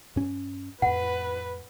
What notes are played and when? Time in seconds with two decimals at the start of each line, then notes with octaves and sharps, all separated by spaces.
0.16 G2 C#4
0.82 F2 A2 B4 F#5